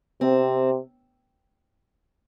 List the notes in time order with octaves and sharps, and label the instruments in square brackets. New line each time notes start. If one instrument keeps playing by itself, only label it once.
[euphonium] C3 [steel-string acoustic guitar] C4